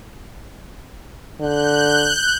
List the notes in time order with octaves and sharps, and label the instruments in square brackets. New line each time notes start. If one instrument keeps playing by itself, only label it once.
[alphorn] D3 [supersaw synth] F#6 G6